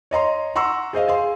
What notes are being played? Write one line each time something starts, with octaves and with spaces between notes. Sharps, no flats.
C#5 D#5 A#5 C6
F#5 A#5 C6 C#6 E6
G#4 C5 D#5 F5
G#4 F5 C6